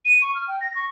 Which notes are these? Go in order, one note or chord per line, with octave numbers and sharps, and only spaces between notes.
D#7
C#6
F6
G5
A#6
C#6